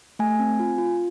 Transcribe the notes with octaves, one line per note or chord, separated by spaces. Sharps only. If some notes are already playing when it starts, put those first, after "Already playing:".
A3 G#5
C4
F4
F4